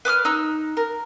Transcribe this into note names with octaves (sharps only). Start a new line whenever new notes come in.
B4 D6 D#6 F6
D#4 E6 F#6
A#4